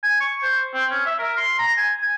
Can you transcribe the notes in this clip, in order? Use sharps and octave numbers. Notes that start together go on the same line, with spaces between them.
G#5
C#6
C5
C4
C#4
E5
A#4
C6
A#5
G#5
G#5